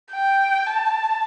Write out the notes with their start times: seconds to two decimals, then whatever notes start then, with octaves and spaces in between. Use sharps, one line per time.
0.12 G5
0.66 A5